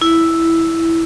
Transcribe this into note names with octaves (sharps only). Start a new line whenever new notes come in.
E4